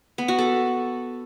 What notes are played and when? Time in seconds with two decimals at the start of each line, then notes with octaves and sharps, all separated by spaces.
0.18 B3
0.28 F#4
0.38 A4